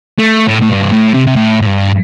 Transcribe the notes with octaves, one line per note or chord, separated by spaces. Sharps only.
A3
A2
A2
G2
C3
A2
C3
C3
A2
A2
G2